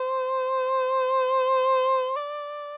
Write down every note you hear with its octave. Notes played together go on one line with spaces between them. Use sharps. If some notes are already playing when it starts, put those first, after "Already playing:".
Already playing: C5
D5